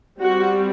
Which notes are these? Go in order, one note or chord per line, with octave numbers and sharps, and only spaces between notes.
G3 C4 F#4